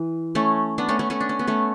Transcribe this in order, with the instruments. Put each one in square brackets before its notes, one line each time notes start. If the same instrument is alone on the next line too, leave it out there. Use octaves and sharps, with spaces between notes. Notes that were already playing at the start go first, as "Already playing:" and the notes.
Already playing: [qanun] E3
A3 C#4
B3 D4
A3 C#4
A3 C#4
A3 C#4
D4
C#4
B3
A3 C#4